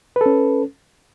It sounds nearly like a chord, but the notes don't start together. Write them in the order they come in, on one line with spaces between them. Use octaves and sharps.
B4 A4 C#4